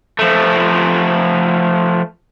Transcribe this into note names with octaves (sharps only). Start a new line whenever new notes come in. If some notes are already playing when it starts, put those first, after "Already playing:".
F3 A3